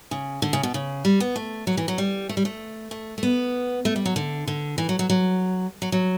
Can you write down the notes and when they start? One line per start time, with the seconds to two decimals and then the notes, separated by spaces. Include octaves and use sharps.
0.11 C#3
0.42 D3
0.53 C#3
0.63 B2
0.74 C#3
1.05 G3
1.20 B3
1.36 A3
1.67 F#3
1.77 E3
1.88 F#3
1.98 G3
2.29 A3
2.37 G3
2.45 A3
2.91 A3
3.18 A3
3.23 B3
3.85 A3
3.96 G3
4.06 F#3
4.16 D3
4.47 D3
4.78 E3
4.89 F#3
4.99 F#3
5.10 F#3
5.82 F#3
5.92 F#3